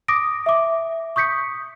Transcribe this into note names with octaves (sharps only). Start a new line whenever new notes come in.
D6 D#6 A#6 D7
E5 D6
C#6 D#6 G6 B6 C#7